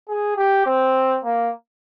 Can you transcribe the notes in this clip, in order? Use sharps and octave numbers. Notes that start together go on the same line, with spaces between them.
G#4
G4
C4
A#3